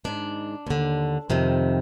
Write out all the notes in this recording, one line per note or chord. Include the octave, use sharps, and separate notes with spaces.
G#2 D#3 D4
D#2 D3
F2 C3 D#3